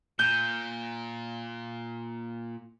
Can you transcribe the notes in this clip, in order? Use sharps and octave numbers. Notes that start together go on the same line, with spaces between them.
A#2 G6